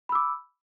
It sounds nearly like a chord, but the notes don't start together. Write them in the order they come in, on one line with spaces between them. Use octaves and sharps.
B5 E6 D6